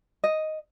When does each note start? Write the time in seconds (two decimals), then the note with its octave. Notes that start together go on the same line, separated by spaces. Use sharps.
0.24 D#5